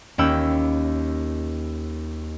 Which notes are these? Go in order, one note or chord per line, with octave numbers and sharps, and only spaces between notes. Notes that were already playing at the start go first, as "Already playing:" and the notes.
D#2 A#3 C#4 G5 B5 E6